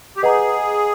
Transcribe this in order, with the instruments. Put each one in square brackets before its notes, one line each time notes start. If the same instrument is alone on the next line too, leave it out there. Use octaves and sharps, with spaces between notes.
[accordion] G4
[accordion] G#4 [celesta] B4 D#5 F#5 A#5